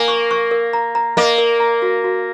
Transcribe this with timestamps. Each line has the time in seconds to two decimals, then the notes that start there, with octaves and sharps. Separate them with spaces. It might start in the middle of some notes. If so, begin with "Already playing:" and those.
Already playing: A#3 G#5
0.08 C#6
0.31 C#6
0.51 A#4
0.73 A#5
0.95 A#5
1.17 A#3 D#5
1.38 A#4
1.60 A#5
1.82 F#4
2.04 F#4